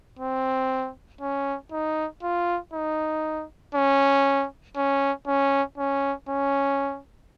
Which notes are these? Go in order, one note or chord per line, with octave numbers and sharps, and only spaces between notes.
C4
C#4
D#4
F4
D#4
C#4
C#4
C#4
C#4
C#4